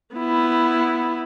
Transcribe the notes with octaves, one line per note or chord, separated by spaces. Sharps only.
B3 E4